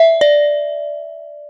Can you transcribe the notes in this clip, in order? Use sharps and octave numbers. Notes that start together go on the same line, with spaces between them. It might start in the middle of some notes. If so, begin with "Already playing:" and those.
Already playing: D5 E5
D5